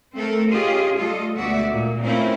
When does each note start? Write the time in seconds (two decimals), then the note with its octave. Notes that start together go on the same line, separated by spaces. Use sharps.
0.14 A3 C4 A4 A#4
0.50 C#4 F4 G4 G#4 D#5
0.97 G3 A3 F4 A4 D#5
1.37 D2 B2 G#3 F#4 D5 E5
1.71 A#2
2.03 A3 C4 C#4 E4 F4 A#4